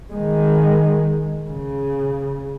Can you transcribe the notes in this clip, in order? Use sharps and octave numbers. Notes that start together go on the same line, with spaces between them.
D#3 G#3
C#3